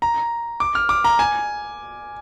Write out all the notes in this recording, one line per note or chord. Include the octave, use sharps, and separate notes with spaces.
A#5
D6
F6
D6
A#5
G#5